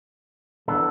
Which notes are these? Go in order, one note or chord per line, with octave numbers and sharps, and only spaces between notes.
E3 B3 D4 A4